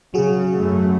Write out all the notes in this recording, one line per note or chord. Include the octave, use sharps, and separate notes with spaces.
C#3 F#3 F#4 G#4
F#2 A3